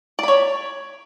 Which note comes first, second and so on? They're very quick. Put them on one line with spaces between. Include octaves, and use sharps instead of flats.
D5 B5 C#5